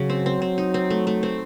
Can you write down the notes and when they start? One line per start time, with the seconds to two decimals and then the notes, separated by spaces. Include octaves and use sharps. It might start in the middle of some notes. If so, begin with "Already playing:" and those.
Already playing: C#3 F#3
0.10 C4
0.26 C4
0.42 C4
0.58 D#4
0.74 C4
0.90 A3
1.07 A3
1.23 C4